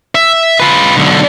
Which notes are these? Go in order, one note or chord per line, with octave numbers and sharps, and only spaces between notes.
E5
F4 B4
B1 D3